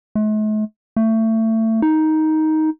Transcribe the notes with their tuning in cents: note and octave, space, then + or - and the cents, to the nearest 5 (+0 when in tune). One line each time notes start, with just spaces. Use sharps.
A3 -45
A3 +25
D#4 +10